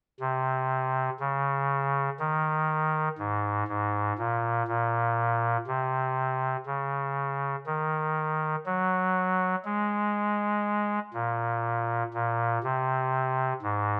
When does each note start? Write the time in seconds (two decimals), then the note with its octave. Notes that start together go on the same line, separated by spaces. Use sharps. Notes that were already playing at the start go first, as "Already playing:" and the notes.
0.20 C3
1.20 C#3
2.19 D#3
3.19 G#2
3.68 G#2
4.18 A#2
4.68 A#2
5.67 C3
6.66 C#3
7.66 D#3
8.66 F#3
9.65 G#3
11.14 A#2
12.13 A#2
12.64 C3
13.62 G#2